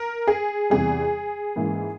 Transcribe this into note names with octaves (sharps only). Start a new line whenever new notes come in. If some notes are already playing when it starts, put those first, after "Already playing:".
Already playing: A#4
G#4
E2 C3 G3 G#4
G#2 E3 A#3 C#4